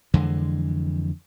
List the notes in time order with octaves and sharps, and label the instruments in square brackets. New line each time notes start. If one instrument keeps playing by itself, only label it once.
[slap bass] F2 D3 E3 G#3